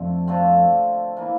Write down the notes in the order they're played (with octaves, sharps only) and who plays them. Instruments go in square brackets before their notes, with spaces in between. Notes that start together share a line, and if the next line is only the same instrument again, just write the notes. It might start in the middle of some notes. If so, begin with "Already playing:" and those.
Already playing: [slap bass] F2 [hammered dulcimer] D3 F3 A3 C4
[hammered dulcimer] D3 F3 A3 C4
E3 A#3 E4